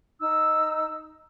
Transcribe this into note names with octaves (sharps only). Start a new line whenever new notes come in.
D#4 E6